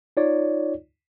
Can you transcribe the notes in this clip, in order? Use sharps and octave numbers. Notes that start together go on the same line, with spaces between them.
D#4 F4 C#5 D5